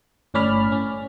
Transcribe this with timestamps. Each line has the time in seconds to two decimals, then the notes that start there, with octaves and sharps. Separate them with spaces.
0.34 G1 A2 C#4 D5 B5 F6
0.72 C#4